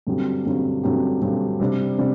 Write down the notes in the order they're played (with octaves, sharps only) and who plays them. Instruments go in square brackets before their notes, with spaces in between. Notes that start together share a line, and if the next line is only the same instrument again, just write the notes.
[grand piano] G2 D3 F#3 C4 G4
G2 D3 F#3 C4 G4
G2 D3 F#3 C4 G4
G2 D3 F#3 C4 G4
C3 G3 D4
C3 G3 D4